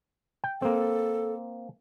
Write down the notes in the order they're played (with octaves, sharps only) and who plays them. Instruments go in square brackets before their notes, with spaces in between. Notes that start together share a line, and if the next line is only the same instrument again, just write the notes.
[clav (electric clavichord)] G5
[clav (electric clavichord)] A#3 C4 [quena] A4